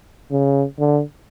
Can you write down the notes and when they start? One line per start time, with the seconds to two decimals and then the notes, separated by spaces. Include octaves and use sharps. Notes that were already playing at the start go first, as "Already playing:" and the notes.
0.31 C#3
0.79 D3